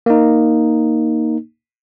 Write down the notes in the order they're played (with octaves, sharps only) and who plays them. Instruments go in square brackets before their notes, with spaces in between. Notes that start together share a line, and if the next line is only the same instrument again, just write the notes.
[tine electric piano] A#3 D#4